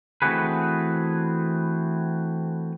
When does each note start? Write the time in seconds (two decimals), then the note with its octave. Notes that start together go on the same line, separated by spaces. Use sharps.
0.22 E3 A3 C4 F#4 G#4 B4